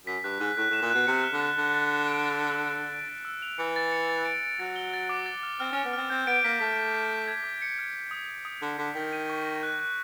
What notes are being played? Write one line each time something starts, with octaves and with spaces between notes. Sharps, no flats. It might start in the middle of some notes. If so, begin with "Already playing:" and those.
F#2 B6
G2 F#6
G#2 F#6
A2 F#6
A2 E7
A#2
B2 F#6
C3 C#7
F6
D3
A6
D3 A6
A6
A6
D7
A6
E6
E6
D7
D7
A6
E6
F7
E3 C#7
A6
C#7
A6
D7
D7
F#3 A6
G7
A6
D6
A6
F6
C4 F6
C#4
F6
B3
C4 F6
C4 G6
B3 D7
A#3 B6
A3 B6
D7
B6
F6
G#6
D6
C#7
F6
C#7
D#6
D#6
D#6
D3 D#6
D3 B6
D#3 B6
D#7
C#6
A#6
F#6
F#6